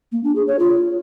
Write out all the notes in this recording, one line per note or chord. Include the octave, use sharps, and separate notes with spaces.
A#3
D4
G#4
C#5
F4